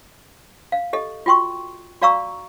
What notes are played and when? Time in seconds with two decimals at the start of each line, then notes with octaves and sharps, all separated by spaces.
0.72 F5
0.93 G4 A4 D#5
1.26 F4 F#4 G5 C6 C#6
2.02 F#4 D5 F5 A#5 C#6 E6